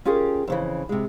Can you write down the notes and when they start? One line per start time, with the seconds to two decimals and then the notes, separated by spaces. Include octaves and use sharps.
0.05 C#4 F4 G4 G#4 A#4
0.47 F2 C#3 E3
0.89 C3 G#3